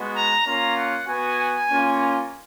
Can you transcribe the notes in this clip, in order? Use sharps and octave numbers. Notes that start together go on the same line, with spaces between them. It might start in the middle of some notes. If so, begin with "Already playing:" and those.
Already playing: G#3 B3 F#4
A#5
A#3 C#4 F4 A#5
F#5
B3 F#4 G#5
A#3 C#4 F4